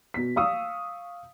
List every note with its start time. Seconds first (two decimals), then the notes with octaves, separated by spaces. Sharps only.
0.14 B2 B6
0.36 F5 C#6 D#6 E6